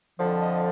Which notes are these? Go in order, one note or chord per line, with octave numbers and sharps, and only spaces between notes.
F2 D3 F3
D#5